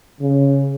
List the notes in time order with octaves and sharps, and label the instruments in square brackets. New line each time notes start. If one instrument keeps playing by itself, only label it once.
[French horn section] C#3